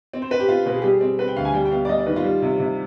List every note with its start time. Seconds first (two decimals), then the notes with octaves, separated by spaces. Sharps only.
0.13 C4
0.22 C5
0.31 C4 B4
0.40 G4
0.48 C4 F4
0.66 B2 B4
0.75 G#4
0.82 G3 G4
0.90 G#4
1.01 C4
1.19 C4 B4
1.28 G5
1.36 D2 F5
1.45 G#5
1.54 G3 G5
1.65 G5
1.71 B3 F5
1.85 D5
1.89 G3 D#5
1.98 D5
2.06 D#3 B4
2.16 F4
2.24 G3
2.42 C3
2.60 C3